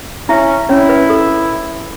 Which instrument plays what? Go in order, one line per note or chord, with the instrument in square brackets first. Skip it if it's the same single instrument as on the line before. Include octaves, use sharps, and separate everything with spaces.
[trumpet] C#4 [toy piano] E4 E5
[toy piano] C#4 C#5 [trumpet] E4
[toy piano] B4
A4